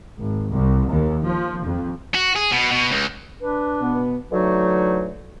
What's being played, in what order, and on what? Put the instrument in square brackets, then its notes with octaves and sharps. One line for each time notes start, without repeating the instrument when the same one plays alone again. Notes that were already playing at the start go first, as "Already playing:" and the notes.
[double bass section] G#1
C2
D#2
F3
F2
[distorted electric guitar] F#4
G#4
B2
B2
C#2
[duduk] D4 [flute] B4
[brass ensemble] B2 B3
[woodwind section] D3 E3 F#3 A3 D#4 F#4